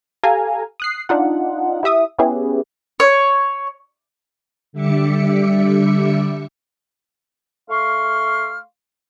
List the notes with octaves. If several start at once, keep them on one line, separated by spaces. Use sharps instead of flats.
G4 A4 F5 G#5 A#5
D#6 F#6 C7
D4 D#4 F4 F#5
E4 G4 E5 D#6
B3 C#4 E4 G4 G#4 B4
C#5
D3 G3 E5 D6 C#7
A3 F5 C6 C#6 F6